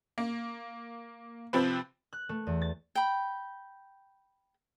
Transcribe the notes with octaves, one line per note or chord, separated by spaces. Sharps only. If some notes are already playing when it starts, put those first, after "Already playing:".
A#3
C3 F3 C4 B4
F#6
A3
E2
A6
G5 B5